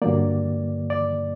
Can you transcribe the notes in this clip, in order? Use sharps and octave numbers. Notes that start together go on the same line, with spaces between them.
G2 D3 F#3 A#3 D5
D5